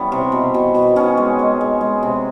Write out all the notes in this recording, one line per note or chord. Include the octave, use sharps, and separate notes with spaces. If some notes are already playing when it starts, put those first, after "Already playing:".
Already playing: E3 G3 B3 C#4
C3
B2
B2
B2
B2 C#4 D#4
G#3
G#3
G#3
G#3
C3